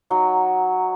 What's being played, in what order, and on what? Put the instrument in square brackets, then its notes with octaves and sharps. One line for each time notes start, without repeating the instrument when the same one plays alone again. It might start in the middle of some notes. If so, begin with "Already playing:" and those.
[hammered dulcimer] F#3 D#4